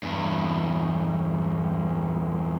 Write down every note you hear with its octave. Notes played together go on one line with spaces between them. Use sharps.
E2 G2